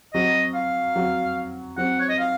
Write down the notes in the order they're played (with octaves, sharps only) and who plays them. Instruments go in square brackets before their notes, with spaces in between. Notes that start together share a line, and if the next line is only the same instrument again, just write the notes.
[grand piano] F#3 C4 F#4 [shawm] D#5
[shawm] F5
[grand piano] F#3 C4 F#4
[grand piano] F#3 C4 F#4 [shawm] F#5
[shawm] C#5
D#5
F5